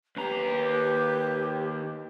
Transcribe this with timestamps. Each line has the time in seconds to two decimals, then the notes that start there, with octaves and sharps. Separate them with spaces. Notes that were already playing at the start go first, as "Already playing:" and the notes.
0.17 D#2 G4 B4 A#5